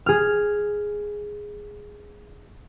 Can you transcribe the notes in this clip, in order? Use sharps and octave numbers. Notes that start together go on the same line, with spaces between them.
G#4 F6